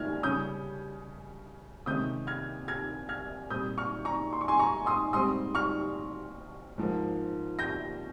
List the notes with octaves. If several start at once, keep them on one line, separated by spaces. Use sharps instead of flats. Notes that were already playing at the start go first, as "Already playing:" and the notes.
Already playing: F6 G#6
C#3 G3 C#4 D#6 G6
C3 D#3 G#3 C#4 D#6 G6
F6 G#6
F6 G#6
F6 G#6
A#2 G3 C4 D#6 G6
C#6 F6
A#5 C#6
C6
C#6
G#5 C6
A#5 C#6
C6 D#6
G#2 G3 C4 C6 D#6
C#6 F6
G#2 F3 A#3
G6 A#6